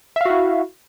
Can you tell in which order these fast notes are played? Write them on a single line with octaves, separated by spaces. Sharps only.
E5 F5 F#4 E4